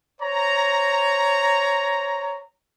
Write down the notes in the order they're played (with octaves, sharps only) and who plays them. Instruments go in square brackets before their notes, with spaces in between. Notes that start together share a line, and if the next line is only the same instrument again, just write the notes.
[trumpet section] C5 C#5 A#5